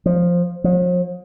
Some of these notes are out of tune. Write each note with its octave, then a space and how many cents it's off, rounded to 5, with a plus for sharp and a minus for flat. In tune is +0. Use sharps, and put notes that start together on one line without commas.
F3 +5
F3 +45